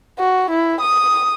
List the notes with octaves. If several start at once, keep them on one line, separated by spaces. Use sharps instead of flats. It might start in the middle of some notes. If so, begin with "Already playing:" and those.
F#4
E4
D#6